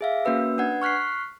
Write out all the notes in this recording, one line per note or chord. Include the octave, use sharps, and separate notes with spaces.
G#4 E5 F5
A#3 C#4 F#4 B4 E6
D4 B4 F#5 G#6
C#6 F6 F#6 B6 C7